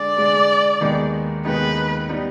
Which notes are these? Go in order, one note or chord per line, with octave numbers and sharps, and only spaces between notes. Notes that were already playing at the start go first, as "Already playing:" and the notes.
Already playing: D3 G#3 D4 G#4 D5
D3 G#3 D4 G#4
D#2 D#3 G#3 B3 D#4
D#2 D#3 G#3 B3 D#4 B4
G3 B3 D#4 B4